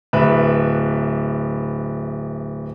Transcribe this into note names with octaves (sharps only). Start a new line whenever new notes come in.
D1 B4 E5